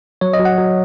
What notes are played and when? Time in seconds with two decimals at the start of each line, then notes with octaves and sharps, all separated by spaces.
0.21 F#3 C#5
0.33 D#5
0.40 F#3
0.45 F#5
0.58 F#3